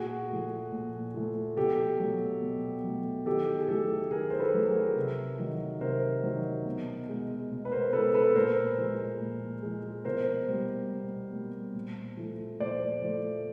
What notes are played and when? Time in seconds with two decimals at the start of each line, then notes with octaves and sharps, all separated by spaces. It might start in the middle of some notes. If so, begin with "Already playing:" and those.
Already playing: A#2 F#4 G#4
0.29 F3 A3
0.72 A#2
1.14 F3 A3
1.57 B2 G4 A4
2.00 F#3 A3
2.42 B2
2.84 F#3 A3
3.26 D#3 G4 A4
3.59 G#4
3.69 F#3 A3 G4 A4
4.11 D#3 G#4 A#4
4.30 C5
4.39 A4 B4
4.54 F#3 A3
4.68 G#4 A#4
4.96 C3
5.39 D#3 F#3
5.81 C3 A#4 C5
6.23 D#3 F#3
6.65 B2
7.09 G#3
7.51 B2
7.65 B4
7.71 A#4 C5
7.93 G#3 A4 B4
8.14 A4 B4
8.35 A#2 A#4 C5
8.78 F3 G#3
9.20 A#2
9.63 F3 G#3
10.05 B2 A#4 C5
10.48 G3 A#3
10.91 B2
11.33 G3 A#3
11.75 A#2
12.17 F3 A3
12.60 A#2 C5 D5
13.02 F3 A3